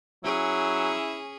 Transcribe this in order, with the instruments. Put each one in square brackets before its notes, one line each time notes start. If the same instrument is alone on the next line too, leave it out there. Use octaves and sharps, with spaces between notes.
[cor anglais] F#3 [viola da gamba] C#4 G#4 [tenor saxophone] E4